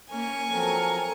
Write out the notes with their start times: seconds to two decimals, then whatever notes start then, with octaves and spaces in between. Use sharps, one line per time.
0.11 A#3 C#4 G#5 C#6
0.50 F3 F#3 C4 A4 A#4